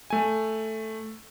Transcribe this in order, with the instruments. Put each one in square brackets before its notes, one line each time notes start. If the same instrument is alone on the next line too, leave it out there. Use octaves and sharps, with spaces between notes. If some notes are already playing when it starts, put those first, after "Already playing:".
[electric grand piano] A3 G#5